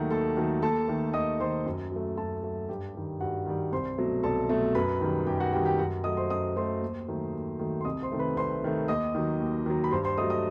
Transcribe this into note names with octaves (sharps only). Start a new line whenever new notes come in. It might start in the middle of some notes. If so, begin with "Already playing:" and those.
Already playing: D#2 D#3 F#3 A3 F#4 F#5
D#2 A4 A5
D#3 F#3 A3
D#2 A4 A5
D#3 A3
D#2 D#5 D#6
D#3 A3 C5 C6
F#2
F#3 A3
F#2 A4 A5
F#3 A3
G2 G4 G5
D#3 G3
G2 F#4 F#5
D#3 G3
C2 C5 C6
B2 F#3 A3
C2 A4 A5
B2 F#3 A3
F#2 B4 B5
D#3 G3
F#2 G4 G5
F#4 F#5
D#3 G3 G4 G5
G4 G5
F#2 F#4 F#5
F#3 A3 D#5 D#6
C5 C6
F#2 D#5 D#6
F#3 A3 C5 C6
D#2
D#3 F#3 A3
D#2
D#3 F#3 A3
C6
C2 D#5 D#6
C5 C6
C3 D#3 A3
B4 B5
C2 C5 C6
C3 D#3 A3
D#2 D#5 D#6
D#3 F#3
D#2
D#3 F#3
B5
G2 C5 C6
C5 C6
F#3 A3 D#5 D#6
D#5 D#6